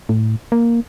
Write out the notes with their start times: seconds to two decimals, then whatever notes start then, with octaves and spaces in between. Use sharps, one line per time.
0.09 A2
0.52 A#3